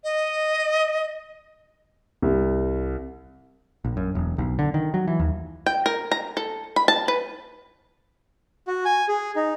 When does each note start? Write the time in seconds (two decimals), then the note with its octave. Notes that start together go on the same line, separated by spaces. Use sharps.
0.04 D#5
2.22 C2
3.85 A#1
3.97 F#2
4.15 E1
4.38 B1
4.59 D3
4.74 D#3
4.94 F#3
5.08 E3
5.20 D#2
5.66 G5
5.86 A#4
6.12 A#5
6.37 A4
6.76 B5
6.88 A5
7.08 B4
8.68 F#4
8.85 G#5
9.08 G#4
9.36 D#4